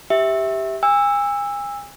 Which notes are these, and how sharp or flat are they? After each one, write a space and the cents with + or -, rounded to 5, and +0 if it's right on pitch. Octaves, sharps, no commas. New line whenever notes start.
G4 +0 E5 -10
G#5 -35 E6 +0